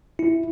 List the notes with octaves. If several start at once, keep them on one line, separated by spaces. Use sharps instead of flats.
E4